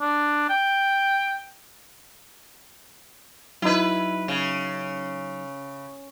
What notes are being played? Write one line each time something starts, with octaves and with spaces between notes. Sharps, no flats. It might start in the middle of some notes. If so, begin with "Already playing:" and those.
D4
G5
F#3 D#4 E4 B4
C#3